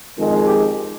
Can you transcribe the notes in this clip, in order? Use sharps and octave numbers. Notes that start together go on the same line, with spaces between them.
F2 D#3 G#3
G4